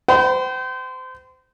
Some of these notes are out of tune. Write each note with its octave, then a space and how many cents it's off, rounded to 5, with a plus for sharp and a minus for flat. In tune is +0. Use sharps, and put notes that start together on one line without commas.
C5 -30 G5 -40 B5 +0